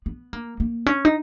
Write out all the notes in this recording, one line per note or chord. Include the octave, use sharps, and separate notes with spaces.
B3
A#3
A#3
C#4
D#4